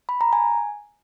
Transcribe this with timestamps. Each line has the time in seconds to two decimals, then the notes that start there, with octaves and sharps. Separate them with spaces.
0.09 B5
0.21 A#5
0.33 G#5